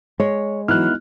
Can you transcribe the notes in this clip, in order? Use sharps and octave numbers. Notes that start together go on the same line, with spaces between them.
G#3 C#5
E3 F#3 B3 D#4 E4 F6 F#6